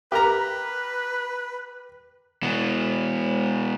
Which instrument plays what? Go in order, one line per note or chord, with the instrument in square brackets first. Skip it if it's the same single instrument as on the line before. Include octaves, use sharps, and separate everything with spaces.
[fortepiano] G4 A#4 A#5 [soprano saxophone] B4
[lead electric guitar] B2 E3